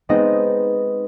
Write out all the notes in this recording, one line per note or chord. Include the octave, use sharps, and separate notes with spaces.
G#3 B3 C4 D#4 D#5